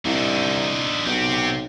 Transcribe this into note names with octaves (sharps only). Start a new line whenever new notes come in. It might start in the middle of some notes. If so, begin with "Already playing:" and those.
C2 D3 D#4
B1 C4 G4